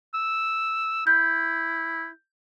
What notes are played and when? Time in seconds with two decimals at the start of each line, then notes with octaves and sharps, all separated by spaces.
0.14 E6
1.07 E4 G6